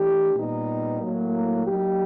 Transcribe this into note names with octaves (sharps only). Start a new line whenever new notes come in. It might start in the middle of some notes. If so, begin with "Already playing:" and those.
Already playing: E3 A3 D4 G4
A#2 G3 B3 D#4
A2 F#3 A#3
F#3 A#3 D#4 G4